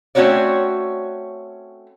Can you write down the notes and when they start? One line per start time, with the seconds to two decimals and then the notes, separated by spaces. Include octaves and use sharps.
0.15 A3 C4 C#4 F#4 C#5 D5